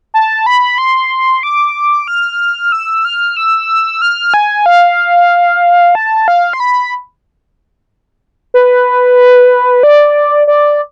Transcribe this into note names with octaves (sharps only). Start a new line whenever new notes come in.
A5
B5
C6
D6
F6
E6
F6
E6
F6
G#5
F5
A5
F5
C6
B5
B4
D5
D5